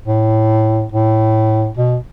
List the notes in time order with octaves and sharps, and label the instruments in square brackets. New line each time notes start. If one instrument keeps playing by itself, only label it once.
[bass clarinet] A2
A2
B2